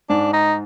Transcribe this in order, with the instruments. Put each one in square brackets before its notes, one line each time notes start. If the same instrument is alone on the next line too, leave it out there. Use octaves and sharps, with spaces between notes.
[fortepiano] G#2 [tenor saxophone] D4
[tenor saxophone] D#4